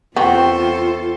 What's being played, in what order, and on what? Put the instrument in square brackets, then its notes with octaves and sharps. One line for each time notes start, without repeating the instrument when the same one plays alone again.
[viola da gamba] E2 A4 C5 [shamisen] B3 C4 [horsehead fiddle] F4 [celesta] G5 C#6